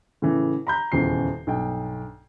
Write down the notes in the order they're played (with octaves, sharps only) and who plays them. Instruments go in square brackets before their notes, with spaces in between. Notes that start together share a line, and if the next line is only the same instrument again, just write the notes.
[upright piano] A2 C#3 E3
A#5 B5 G6
D#1 E2 C#3 C7
B1 G2 G5